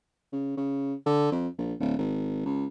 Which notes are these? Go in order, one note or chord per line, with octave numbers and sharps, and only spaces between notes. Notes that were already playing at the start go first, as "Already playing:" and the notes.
C#3
C#3
D3
F2
A#1
D1
G#1
C#2